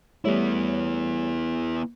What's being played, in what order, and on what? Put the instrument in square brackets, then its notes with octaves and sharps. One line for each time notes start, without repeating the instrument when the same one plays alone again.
[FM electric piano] G3 A3 C#5 [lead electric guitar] B3 E4